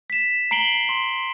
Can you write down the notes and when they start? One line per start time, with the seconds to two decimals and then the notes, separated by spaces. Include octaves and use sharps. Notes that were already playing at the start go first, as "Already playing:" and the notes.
0.10 B6 E7
0.51 A#5 C7 D7 F#7 G7
0.89 C6